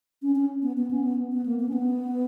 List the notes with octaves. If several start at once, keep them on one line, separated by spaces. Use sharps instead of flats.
C#4
C#4
B3
B3
C#4
B3
B3
A#3
B3
C#4
B3